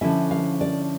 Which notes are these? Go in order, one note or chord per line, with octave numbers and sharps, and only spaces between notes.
D3 F3 C#4 E4 E5
F5
D5